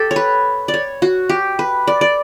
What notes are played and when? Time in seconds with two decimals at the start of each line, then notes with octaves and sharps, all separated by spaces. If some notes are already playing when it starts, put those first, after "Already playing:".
Already playing: G4 A4
0.11 C#5
0.16 B4
0.68 D5
0.74 C#5
1.02 F#4
1.29 G4
1.59 B4
1.87 D5
2.01 D5